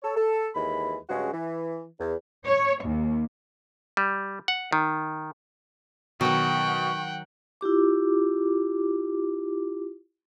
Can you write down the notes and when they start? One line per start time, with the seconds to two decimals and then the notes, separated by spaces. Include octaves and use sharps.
0.03 A4 C#5
0.15 A4
0.55 D#2 E3 G#3 B5
1.09 G2 C#3 F#3 G#3 C#4 F#4
1.32 E3
1.99 E2
2.46 C#5
2.85 D#2
3.97 G3
4.48 F#5
4.73 D#3
6.21 B2 D#3 F#3 F#5 G5 C#6
7.61 E4 F4 G4 D6